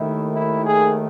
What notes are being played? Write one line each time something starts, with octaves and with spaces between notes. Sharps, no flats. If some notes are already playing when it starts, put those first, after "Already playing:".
Already playing: D#2 D#3 A3 E4
E4
G#4